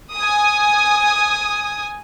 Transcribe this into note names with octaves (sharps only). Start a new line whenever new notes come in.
G#5 D#6